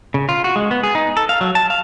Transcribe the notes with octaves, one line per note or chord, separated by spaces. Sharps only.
C#3
F4
F#4
G#3
B3
G#4
D#4
A4
F5
F#3
A5
F5